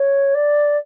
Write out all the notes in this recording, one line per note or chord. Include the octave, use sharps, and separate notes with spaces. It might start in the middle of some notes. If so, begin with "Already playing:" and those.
Already playing: C#5
D5